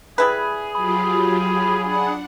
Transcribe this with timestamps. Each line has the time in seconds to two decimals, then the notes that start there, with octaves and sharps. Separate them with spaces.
0.18 G3 E4 G#4 B4
0.75 F#3 F4 G4 B5
1.82 D4 G#4 F#5